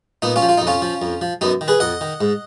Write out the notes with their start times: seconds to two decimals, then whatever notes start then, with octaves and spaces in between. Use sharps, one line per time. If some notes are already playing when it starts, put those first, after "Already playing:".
0.22 A#2 B3 D#4
0.36 C#4 F4
0.42 F3
0.49 F4
0.58 F2 D#4
0.67 C#4 F4
0.82 F3
1.02 F2
1.21 F3
1.41 F#2 B3 D#4
1.61 D#3
1.68 G#4 B4
1.80 F2 D#5 F#5
2.01 D#3
2.21 G#2